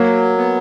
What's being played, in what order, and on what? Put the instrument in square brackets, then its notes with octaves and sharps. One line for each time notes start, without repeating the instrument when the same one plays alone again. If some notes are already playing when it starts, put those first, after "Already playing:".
Already playing: [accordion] F#3 [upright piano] A#3
[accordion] B3